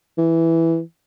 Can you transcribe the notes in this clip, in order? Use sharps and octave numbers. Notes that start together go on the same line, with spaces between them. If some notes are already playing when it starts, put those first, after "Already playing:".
E3